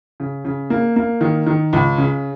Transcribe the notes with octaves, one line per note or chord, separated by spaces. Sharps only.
C#3
C#3
A#3
A#3
D#3
D#3
C#2
C#3